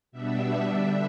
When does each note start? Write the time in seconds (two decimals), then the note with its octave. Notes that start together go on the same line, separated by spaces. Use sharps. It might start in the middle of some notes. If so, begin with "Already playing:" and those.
0.12 B2 G3 B3 D4 E5
0.65 D3 G3 D4 E5